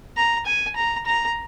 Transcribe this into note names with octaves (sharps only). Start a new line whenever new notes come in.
A#5
G#5
A#5
A#5